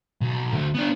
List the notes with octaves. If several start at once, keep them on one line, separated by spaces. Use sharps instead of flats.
B1
D2
B3 D4